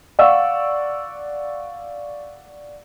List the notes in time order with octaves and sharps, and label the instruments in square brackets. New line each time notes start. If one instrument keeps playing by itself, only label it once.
[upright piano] D5 F5 F#5 C#6 E6